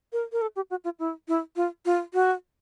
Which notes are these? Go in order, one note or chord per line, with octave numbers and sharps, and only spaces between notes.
A#4
A#4
A4
G4
F#4
F4
E4
E4
F4
F4
F#4